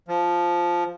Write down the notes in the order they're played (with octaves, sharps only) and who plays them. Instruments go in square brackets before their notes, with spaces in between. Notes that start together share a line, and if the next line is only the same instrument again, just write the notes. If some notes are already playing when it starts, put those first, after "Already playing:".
[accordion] F3